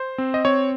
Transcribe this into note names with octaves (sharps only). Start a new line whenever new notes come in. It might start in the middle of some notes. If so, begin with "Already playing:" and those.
Already playing: C5
C4
D#5
C4 C#5